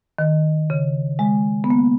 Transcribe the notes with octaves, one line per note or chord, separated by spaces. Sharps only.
D#3
C#3
G#3
B3
A#3